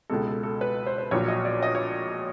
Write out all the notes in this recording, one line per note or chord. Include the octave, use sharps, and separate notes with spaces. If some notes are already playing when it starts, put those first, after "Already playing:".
C#2 B2 G#3 A4
A4
A4
B4
C5
C5
A#1 A#2 F#3 C#5
D#5
D5
D#5
C#5